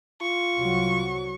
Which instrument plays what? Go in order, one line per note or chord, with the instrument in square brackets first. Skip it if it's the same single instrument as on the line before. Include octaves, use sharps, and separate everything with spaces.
[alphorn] F4 [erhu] C#6
[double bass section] C2 F#3